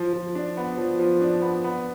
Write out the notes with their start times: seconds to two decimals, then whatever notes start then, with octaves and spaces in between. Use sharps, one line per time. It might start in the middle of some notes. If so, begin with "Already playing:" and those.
Already playing: F3
0.13 F3
0.35 D4
0.57 B3
0.77 F3
0.99 F3
1.21 D4
1.42 B3
1.64 B3